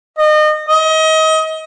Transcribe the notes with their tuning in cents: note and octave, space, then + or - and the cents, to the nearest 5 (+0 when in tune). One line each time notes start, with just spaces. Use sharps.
D#5 -30
D#5 +30